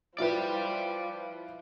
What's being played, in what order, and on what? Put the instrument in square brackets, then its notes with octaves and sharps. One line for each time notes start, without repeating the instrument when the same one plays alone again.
[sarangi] F3 [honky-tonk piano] E4 F4 B4 [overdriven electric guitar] D5 G5